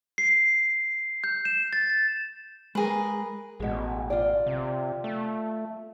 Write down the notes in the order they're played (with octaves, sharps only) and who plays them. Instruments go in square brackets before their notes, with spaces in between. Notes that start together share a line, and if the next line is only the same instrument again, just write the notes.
[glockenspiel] C7
G6
E7
A6
[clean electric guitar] G#3 A#4 [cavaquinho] G#4 B4
[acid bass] A1 [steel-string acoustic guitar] B2 G#3
[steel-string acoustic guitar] F4 D5
[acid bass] C3
A3